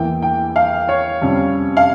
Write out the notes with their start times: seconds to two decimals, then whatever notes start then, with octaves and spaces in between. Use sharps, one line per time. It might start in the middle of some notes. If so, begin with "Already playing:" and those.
Already playing: E2 E3 A#3 G5
0.22 G5
0.56 F5
0.89 C#5
1.21 F2 C3 G3 C#4
1.77 F5